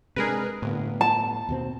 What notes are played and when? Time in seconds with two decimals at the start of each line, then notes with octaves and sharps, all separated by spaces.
0.16 C3 G#3 D4 G#4 A#4 B4
0.62 G1 A2 B3
1.01 A5
1.49 D#2 B2 C4